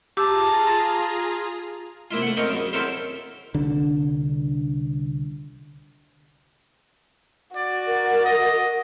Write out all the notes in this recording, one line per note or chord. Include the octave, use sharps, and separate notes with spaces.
F4 G4 G#4 A5 A#5 D6 E6
C3 A#3 E4 F4
A3 F#5
C4 C#4 D#4 A#4 C#5 D#5
F#2 C#3
C4 C#4 E4 A4 A#4 C5
C2 D3 D4
F#4 D5
A#4
D#5